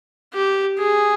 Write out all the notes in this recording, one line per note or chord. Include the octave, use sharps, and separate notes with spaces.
G4
G#4